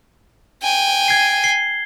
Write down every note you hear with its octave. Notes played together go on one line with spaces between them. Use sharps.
G5 G#5
G#6 C7
C7 G7